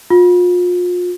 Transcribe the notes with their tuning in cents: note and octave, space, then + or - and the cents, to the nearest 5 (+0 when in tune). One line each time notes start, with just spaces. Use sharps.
F4 +35